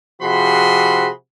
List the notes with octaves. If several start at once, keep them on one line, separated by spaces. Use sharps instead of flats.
C3 F3 F#4 G#4 B5 C6